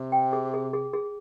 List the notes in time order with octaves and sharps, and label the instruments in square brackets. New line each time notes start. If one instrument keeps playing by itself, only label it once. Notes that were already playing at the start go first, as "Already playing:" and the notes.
Already playing: [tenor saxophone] C3
[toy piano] G5
G#4
G#4
G#4
G#4